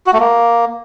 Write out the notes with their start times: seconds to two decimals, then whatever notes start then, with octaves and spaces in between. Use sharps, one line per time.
0.06 F#4
0.13 A3
0.20 A#3